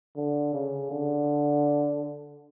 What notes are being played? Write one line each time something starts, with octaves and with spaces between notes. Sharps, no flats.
D3
C#3
D3